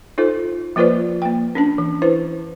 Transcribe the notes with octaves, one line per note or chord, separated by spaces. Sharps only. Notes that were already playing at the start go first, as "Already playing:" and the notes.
D#4 F4 A4 C5
F3 A#3 F4 B4 C5 D5
A#3 G5
C#4 D4 A5
E3
E4 B4 C5